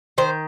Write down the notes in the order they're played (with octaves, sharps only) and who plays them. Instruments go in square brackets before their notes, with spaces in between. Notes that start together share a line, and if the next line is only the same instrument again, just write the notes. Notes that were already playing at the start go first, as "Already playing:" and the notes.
[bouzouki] D#3 C5